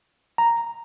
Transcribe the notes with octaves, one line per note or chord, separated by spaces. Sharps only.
A#5